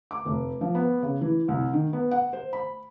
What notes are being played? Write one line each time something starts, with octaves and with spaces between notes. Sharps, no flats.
D6
F1
F3
B3
C#3
E3
C2
D#3
B3
F#5
C5
B5